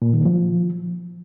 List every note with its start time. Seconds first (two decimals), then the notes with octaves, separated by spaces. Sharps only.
0.02 A#2
0.13 D#3
0.25 F3